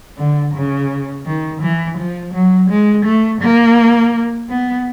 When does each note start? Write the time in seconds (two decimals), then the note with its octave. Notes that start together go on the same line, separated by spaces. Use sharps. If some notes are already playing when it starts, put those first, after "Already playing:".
0.18 D3
0.55 C#3
1.26 D#3
1.62 E3
1.98 F3
2.34 F#3
2.70 G#3
3.05 A3
3.41 A#3
4.50 B3